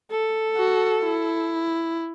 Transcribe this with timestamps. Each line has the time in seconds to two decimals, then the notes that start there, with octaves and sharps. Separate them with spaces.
0.11 A4
0.56 F#4
1.03 E4